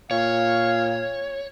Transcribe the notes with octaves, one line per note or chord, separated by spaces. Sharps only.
A#2 C#5 F5